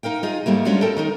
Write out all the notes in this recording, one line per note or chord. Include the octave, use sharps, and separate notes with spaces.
D#4 A#4 F5 G5
D#4 F4 G#4
G#2 G3 A3 A#3
G#3 C#4 D4 F4 F#4
A4 A#4 G5 A5
D#3 D#4 A#4